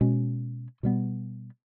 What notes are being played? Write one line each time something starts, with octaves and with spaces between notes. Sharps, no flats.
B2 G#3 C#4
B2 G3 B3